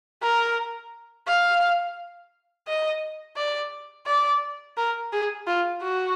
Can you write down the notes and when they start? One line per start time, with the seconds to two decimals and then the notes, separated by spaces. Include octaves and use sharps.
0.22 A#4
1.27 F5
2.68 D#5
3.37 D5
4.07 D5
4.77 A#4
5.13 G#4
5.47 F4
5.82 F#4